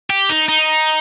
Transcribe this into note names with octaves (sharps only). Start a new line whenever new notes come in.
G4
D#4
D#4